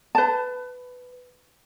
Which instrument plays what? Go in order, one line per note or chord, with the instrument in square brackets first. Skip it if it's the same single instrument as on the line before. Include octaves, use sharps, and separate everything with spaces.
[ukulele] B4 A5